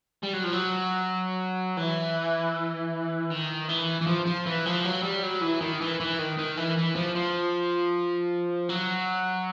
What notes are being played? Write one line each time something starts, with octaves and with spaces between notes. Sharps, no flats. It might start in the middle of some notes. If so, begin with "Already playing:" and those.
G3
F#3
F3
F#3
E3
D#3
E3
E3
F3
F3
E3
F3
F#3
G3
F#3
E3
D#3
E3
E3
D#3
D#3
E3
E3
F3
F3
F#3